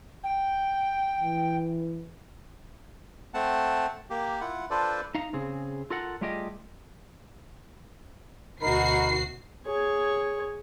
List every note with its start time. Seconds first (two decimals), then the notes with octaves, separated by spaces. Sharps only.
0.24 G5
1.19 E3
3.34 A3 C4 F#5 A5
4.10 A#3 G4
4.40 E4 F4 F#5
4.71 D4 F4 A4 B4 C5 D5
5.15 D#4 F5 A#5
5.33 C#3 C4 G#4
5.90 F4 A4 A#4 F#5
6.21 G3 A3 F4 G4 G#4 D#5
8.62 D2 B2 D#4 F#4 A#4 B5 C7
9.66 G#4 C#5